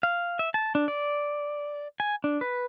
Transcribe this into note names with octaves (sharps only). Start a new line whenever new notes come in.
F5
E5
A5
D4
D5
G#5
D4
B4